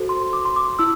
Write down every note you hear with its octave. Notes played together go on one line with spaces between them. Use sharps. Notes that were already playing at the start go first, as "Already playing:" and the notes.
Already playing: F#4 A4 C5
C6
D6
C6
D6
E4 E6